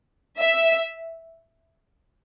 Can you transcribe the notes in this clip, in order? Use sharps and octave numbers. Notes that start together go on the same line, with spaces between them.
E5